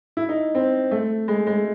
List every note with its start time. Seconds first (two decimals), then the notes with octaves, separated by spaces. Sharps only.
0.17 E4
0.29 D#4
0.55 C4
0.91 A3
1.28 G#3
1.47 G#3